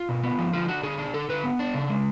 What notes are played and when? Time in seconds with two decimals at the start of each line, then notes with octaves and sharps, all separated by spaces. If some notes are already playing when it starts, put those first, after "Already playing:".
Already playing: F4
0.09 B2
0.23 B3
0.39 F3
0.53 D3 F4
0.68 D4 F#4
0.83 D3 G#4
0.98 D4
1.14 D3 A4
1.29 D3 B4
1.44 B3
1.59 D4
1.74 C#3
1.90 G#3